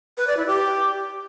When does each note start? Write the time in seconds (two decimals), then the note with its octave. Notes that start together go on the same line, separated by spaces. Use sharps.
0.17 B4
0.27 D5
0.37 E4
0.47 G4